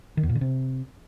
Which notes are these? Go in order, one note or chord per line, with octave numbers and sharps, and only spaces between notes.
D#3
E2
A#2
D3
C3